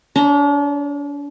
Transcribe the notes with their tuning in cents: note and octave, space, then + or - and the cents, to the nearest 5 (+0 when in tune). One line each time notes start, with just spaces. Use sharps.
D4 -40 C#5 -5 A#5 -25